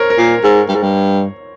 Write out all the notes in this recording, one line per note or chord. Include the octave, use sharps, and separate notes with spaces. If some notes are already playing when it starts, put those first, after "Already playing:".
Already playing: A#4 C5 C#5
A#4
A#2
G#2
G2
G#2
G2